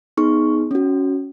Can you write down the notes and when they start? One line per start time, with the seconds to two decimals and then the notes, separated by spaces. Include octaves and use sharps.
0.17 B3 D#4 G#4 C#6
0.71 C#4 F#4